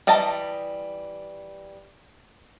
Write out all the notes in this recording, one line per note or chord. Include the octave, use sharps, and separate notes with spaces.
E3 G3 D#5 A5 A#5